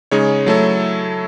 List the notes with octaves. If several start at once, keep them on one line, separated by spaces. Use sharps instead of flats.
C#3 G#3 D#4 G#4 C#5
F#3 A3 E4 A4 C#5